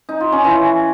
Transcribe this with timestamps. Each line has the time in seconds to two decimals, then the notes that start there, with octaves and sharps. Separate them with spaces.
0.09 D#4
0.21 F4
0.32 C#4
0.44 E3